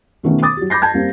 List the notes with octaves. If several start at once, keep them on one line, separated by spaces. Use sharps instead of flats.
B2 D#3 A3 B3 C#4
D6 D#6 A6
F#3 G4
B5 D6 G6 A#6 C7
A5 G6 G#6
G3 A#3 C4